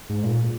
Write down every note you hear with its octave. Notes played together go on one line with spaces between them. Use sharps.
G#2
A#2